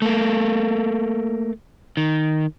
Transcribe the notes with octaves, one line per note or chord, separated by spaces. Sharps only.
A3 A#3
D#3